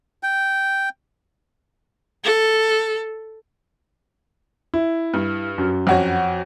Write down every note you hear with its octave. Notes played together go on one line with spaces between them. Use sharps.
G5
A4
E4
G2
F#2
F2 F#4 C#5